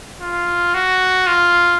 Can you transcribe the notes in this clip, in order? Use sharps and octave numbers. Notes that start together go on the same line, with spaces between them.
F4
F#4
F4